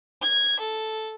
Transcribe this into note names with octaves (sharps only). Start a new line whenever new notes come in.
G#6
A4